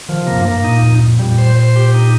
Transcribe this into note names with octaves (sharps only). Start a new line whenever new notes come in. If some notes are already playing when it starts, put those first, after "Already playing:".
D#3 F3
C3 A#3
F2
G2
A#3
G2
A#2 D#4
F2
F2
A#2 G3
C5
C5
G4
D#4